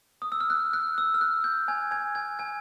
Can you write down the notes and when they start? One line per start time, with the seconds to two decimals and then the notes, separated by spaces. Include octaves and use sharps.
0.22 D#6
0.32 E6
0.41 F6
0.50 F#6
0.73 F#6
0.98 E6
1.14 F6
1.21 F#6
1.44 G6
1.68 G#5 G#6
1.91 G#5 G#6
2.15 G#5 G#6
2.39 G#5 G#6